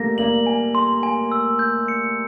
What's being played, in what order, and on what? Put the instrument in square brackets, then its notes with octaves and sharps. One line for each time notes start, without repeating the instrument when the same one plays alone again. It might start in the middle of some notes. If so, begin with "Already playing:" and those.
Already playing: [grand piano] G3 A3 A#3 [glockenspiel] A#6
[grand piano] A#3 [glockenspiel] F#7
[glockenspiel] G#5
C6
G#5
E6
G6
C#7